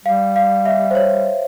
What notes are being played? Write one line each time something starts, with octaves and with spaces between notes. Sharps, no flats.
G3 F5
F5
E5
C5
C#5